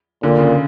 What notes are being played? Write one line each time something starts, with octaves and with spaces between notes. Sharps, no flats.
A#2 D3
C#3